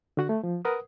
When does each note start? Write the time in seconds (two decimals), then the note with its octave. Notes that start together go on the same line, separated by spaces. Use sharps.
0.17 D3 F#4 F#5
0.29 A3
0.43 F3
0.65 A#4 B4 F#5 D#6